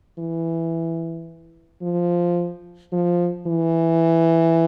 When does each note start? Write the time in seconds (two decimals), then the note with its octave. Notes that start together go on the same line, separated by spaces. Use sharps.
0.19 E3
1.82 F3
2.92 F3
3.47 E3